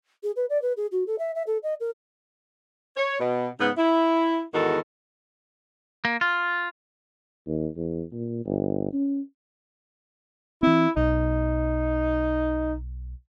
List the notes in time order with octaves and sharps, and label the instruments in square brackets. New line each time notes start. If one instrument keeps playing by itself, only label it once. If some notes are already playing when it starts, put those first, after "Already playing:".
[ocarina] G#4
B4
D5
B4
G#4
F#4
A4
E5
E5
A4
D#5
A#4
[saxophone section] C#5
B2
G#2 C#3 B3
E4
E2 G#2 D#3 F#4 A4
[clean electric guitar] A#3
F4
[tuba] D#2
E2
A#2
G1
C#4
[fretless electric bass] E3 C4 [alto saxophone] E4
[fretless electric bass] B1 [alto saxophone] D#4